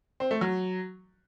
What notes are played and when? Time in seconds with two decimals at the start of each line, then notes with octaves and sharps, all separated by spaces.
0.20 C4
0.31 A3
0.41 F#3